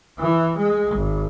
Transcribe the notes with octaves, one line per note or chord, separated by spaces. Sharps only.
E3
G#3
G#1